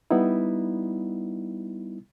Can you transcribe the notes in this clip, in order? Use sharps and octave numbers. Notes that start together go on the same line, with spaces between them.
G3 B3 D#4 E4